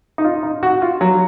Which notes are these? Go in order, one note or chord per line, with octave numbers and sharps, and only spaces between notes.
D#4
F4
D#4
F#4
F4
F#3